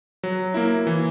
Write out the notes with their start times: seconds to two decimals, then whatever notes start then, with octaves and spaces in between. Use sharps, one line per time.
0.23 F#3
0.54 A#3 E4
0.87 E3